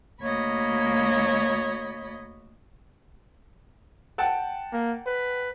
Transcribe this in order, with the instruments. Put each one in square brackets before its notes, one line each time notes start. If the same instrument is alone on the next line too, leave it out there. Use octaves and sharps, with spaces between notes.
[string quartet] D2 A#3 C#5 D#5 B5
[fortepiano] F#5 G5 A5
[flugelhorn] A#3
B4